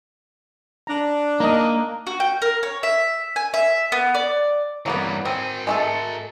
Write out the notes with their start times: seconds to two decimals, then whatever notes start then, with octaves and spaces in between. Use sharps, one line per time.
0.87 D4 A#5
1.40 A#3 D#4 D#5 A#5
2.07 F#4
2.20 G5
2.42 A#4
2.63 C#5
2.83 E5
3.36 G#5
3.54 E5
3.92 B3
4.15 D5
4.86 G2 E3 F#3 A#3 B3
5.25 C4 A#4 G#5
5.67 G#3 A3 A4